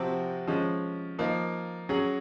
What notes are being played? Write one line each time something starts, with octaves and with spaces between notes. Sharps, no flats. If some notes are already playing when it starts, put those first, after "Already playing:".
Already playing: C3 F3 C4 F#4
F3 G#3 C#4
F3 A#3 D#4
F#3 C#4 G#4